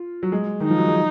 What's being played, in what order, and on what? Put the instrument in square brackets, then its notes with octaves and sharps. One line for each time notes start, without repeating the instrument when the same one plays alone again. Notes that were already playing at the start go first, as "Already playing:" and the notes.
Already playing: [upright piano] F4
F#3
G#3
[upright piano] D#3 [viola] D#4
[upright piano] F3
F#3
G#3